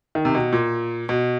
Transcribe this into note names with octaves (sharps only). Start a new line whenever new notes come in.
D#3
C3
B2
A#2
B2